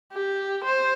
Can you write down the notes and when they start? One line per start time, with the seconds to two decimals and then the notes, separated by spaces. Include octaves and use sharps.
0.13 G4
0.64 C5